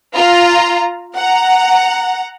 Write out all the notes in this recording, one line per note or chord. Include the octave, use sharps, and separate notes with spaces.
F4 A#5
F#5 A#5